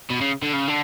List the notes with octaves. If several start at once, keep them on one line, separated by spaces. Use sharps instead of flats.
B2
C#3
D3
C#3
D3